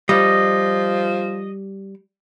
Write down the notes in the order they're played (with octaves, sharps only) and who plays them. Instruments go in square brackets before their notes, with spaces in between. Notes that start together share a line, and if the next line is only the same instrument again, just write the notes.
[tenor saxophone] F3 [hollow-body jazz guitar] G3 [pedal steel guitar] D#5